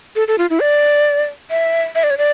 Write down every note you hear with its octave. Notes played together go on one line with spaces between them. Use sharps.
A4
A4
F4
E4
D5
E5
E5
D5
C#5
D5